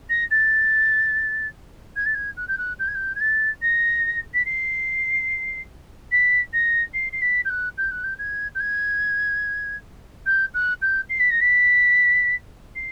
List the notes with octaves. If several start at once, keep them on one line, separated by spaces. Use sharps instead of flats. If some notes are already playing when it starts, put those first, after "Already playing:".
A#6
A6
G#6
A6
G#6
F#6
G6
F#6
G6
G#6
G6
G#6
A6
A#6
B6
C7
B6
A#6
C7
C7
B6
G6
F#6
G6
F#6
G6
G#6
G6
G#6
G6
F#6
G6
C7
B6
A#6
B6
C7